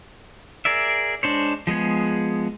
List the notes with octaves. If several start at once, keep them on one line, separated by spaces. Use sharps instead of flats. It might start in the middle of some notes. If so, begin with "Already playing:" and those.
G#4 A#4 D5 E5
G#3 D4 C5 C#5
F3 G#3 B3 G#4